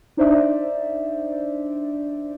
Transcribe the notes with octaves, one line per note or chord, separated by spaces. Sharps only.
D4 D#4 C5 D5 E5